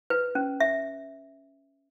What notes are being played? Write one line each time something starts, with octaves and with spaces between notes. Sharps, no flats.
B4
C#4
E5